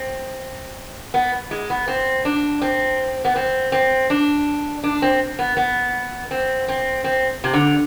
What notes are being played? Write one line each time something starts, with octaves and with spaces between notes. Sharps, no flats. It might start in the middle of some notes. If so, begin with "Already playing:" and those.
Already playing: C4
B3
G#3
B3
C4
D4
C4
B3
C4
C4
D4
D4
C4
B3
B3
C4
C4
C4
C3
D3